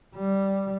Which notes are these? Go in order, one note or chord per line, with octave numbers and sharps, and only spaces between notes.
G3